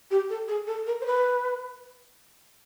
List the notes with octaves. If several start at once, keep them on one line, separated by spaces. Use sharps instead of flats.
G4
A4
G#4
A4
A#4
C5
B4